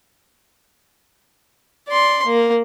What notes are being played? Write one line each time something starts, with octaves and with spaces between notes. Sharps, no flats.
D5 C6
A#3